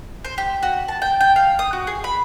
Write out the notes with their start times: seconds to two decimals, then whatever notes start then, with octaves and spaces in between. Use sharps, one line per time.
0.25 C5
0.38 G4
0.63 F#4
0.88 A5
1.02 G5
1.21 G5
1.36 F5
1.59 D#6
1.73 F#4
1.87 G#4
2.04 B5